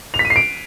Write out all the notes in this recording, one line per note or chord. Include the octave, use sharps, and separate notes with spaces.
F7
B6
D#7
C7
D7